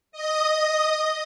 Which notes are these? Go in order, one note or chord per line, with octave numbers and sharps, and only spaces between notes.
D#5 D#6